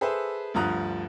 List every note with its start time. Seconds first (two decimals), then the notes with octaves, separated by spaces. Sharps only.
0.01 G#4 A4 B4 C5 E5
0.54 D2 G2 F3 A#5 D#6 F#6